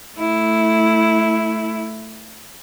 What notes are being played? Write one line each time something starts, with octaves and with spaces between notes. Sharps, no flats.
A3 E4